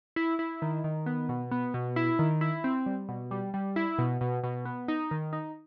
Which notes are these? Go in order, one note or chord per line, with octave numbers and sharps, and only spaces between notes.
E4
E4
D#3
D#3
B3
B2
B3
B2
E4
D#3
E4
C4
G3
B2
G3
G3
E4
B2
B2
B2
B3
D#4
D#3
D#4